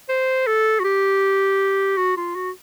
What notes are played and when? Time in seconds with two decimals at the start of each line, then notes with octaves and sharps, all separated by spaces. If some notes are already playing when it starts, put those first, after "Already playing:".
0.09 C5
0.47 A4
0.79 F#4
0.84 G4
1.97 F#4
2.17 F4
2.35 F#4